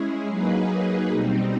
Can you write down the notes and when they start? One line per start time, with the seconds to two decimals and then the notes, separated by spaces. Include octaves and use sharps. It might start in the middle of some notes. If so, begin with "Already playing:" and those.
Already playing: G#3 C#4 E4 G#4
0.28 F#3 A#3 D#4 G#4 B4
1.10 B2 G3 C4 D#4